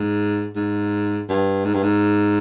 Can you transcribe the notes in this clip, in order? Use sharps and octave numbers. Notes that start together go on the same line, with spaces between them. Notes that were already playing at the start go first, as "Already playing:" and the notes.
Already playing: G#2
G#2
G2
G#2
G2
G#2